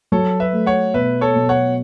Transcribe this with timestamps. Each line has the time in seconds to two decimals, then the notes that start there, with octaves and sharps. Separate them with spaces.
0.12 F#3 A4 C#5
0.40 B4 E5
0.53 A3
0.66 C#5 F#5
0.94 B2 B4 E5
1.21 A4 C#5
1.35 B2
1.49 C#5 F#5